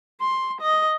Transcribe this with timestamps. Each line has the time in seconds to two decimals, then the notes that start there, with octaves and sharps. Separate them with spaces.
0.21 C6
0.61 D#5